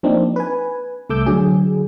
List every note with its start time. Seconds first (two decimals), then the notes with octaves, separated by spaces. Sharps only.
0.03 F3 A#3 C4 D4 D#4
0.36 B4 G#5
1.10 C2 A3 A4 D6 E6 G6
1.26 D3 F#3 G#4